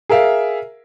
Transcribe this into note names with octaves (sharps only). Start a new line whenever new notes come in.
G#4 A#4 E5 F5